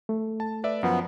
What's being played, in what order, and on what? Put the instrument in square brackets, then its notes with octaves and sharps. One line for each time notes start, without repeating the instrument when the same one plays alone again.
[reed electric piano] A3
[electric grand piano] A5
B4 D5 E5
[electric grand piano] F#2 F3 [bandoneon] B3